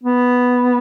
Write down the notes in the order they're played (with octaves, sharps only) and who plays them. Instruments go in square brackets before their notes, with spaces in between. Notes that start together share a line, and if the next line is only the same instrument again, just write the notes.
[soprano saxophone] B3